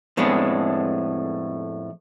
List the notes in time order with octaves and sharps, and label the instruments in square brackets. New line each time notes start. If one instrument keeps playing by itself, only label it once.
[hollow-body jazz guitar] F2 A2 G#3 B3 D4